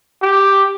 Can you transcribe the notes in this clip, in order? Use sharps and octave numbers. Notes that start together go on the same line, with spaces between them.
G4